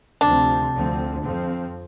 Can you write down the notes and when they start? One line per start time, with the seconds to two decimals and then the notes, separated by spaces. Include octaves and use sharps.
0.21 D2 C3 F3 C4 D4
0.72 D2 D3 F3 C4
1.23 F2 F3 C4